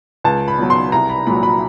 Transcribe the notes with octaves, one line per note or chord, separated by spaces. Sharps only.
C#2 A5
B5
B2 F#3
C6
C2 A#5
B5
A#2 F#3 B5
B5